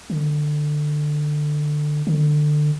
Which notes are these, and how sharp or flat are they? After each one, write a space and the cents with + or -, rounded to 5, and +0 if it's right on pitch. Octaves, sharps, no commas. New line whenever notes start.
D3 +20
D3 +25